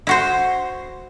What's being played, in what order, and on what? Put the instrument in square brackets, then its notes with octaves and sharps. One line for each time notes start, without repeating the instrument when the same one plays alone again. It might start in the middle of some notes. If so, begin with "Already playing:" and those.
[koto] E4 F#4 C5